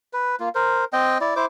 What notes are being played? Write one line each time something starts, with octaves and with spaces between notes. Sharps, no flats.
B4
A#3 F4
A#4 C5
C4 D#5 G5
E4 D5
E4 C5 D6